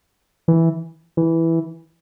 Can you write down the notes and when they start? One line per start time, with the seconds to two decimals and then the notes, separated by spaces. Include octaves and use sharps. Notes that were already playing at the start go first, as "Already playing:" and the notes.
0.48 E3
1.17 E3